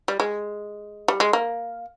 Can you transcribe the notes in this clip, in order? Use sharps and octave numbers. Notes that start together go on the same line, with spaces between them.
G3
G#3
G3
G#3
A#3